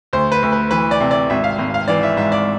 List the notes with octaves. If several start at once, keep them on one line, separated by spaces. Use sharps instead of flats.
D2 C5
B4
D2
B4
E3 B4
D5
C3
D5
G#1 E5
F5
G#1
F5
E3 D5
E5
G#2 E5
D5